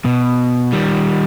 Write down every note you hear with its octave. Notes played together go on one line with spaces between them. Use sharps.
B2
D#3 G3